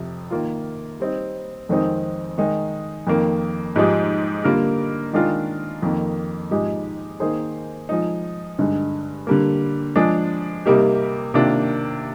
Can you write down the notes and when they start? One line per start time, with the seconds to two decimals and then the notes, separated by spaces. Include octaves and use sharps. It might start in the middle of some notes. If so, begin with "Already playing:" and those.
Already playing: F2 C3 F3
0.30 D#3 A#3 F4
1.00 G3 C4 D#4
1.69 F2 D#3 G#3 C4 D#4
2.38 D#3 G#3 D#4
3.07 F2 D#3 A#3
3.76 G#2 F3 G#3 D#4 G4
4.44 D3 G3 A#3 F4 A#4
5.13 D#3 G#3 D4 F4 A#4
5.82 F2 D#3 A#3
6.51 G#2 F3 G#3 D#4 G4
7.20 D#3 A#3 D#4 G#4 C5
7.89 F3 G#3 D#4
8.59 G2 D3 G#3 D#4
9.27 D3 G3 A#3
9.96 F3 G#3 D4 G#4
10.66 C3 G3 A#3 D#4 G4
11.34 C3 D#3 A#3 D4 F4